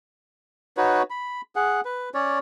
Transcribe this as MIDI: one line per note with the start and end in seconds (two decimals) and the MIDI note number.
0.77 1.02 63
0.77 1.02 66
0.77 1.02 71
0.77 1.02 73
1.10 1.41 83
1.56 1.81 68
1.56 1.81 78
1.85 2.09 71
2.14 2.39 61
2.14 2.39 73
2.14 2.39 74